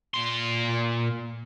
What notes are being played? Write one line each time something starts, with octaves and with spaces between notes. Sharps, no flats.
A#2 C6